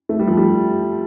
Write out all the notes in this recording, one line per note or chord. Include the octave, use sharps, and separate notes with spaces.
A3
G3
F3
G3